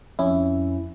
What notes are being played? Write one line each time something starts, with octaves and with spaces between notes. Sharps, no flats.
F2 C#4 E4